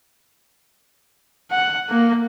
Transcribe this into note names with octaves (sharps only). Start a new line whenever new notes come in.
F#5
A#3